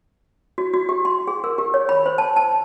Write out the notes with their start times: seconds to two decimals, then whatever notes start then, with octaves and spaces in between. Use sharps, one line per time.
0.58 F#4
0.74 F#4
0.89 G4
1.05 C6
1.27 G#4
1.44 A#4
1.58 G4
1.74 C#5
1.89 B5
2.06 C5
2.18 A5
2.36 A5